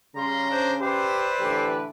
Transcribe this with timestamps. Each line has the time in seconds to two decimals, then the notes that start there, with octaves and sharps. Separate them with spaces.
0.16 C#3 G3 F5 A#5 C6
0.49 D4 G#4 C5
0.81 G4 B4 C5 D5 E5
1.40 A2 D3 E3 G4